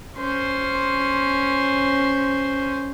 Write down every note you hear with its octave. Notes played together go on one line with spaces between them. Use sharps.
C#4 C5